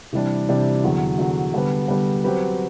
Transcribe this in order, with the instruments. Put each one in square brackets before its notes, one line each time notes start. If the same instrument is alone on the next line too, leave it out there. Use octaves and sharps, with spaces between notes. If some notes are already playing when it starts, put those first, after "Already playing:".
[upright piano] C3 E3 G3 D4
C3 E3 G3 D4
E2 D3 F#3
E2 D3 F#3
D3 G3 B3
D3 G3 B3
F#3 C4 G4 B4